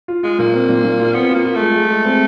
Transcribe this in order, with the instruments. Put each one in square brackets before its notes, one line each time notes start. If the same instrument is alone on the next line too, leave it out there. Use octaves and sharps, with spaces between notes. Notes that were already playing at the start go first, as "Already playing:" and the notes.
[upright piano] F4
[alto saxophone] G#3 [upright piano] F4
[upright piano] A#2 [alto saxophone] A#3
[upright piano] C4
A#2
A#2
F4
[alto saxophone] B3 [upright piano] C4
[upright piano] F4
[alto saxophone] A#3
[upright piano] F4
[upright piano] G#3 [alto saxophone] A3
[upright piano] G#3
G#3
C4